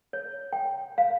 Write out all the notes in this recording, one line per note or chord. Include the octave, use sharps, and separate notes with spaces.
C#5
G5
F5